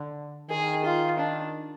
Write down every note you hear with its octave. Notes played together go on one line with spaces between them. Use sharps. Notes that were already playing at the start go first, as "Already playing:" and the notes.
Already playing: D3
D#3 G#4
F4
D4